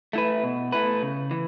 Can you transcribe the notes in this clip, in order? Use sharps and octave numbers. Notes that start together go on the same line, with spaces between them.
A3 E4 B4
B2
A3 E4 B4
C#3
E3